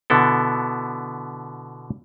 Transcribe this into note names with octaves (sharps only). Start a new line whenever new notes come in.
B2 D3 B3 E4 A4